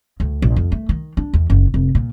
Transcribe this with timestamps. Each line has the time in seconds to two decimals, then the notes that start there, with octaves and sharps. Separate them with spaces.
0.20 D2
0.42 A#1
0.56 F2
0.72 A3
0.89 D#3
1.17 D4
1.34 E2
1.50 F#1
1.74 F1
1.95 A#2